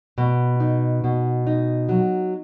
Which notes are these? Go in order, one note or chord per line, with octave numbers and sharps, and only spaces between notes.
B2
D#4
B2
D#4
F#3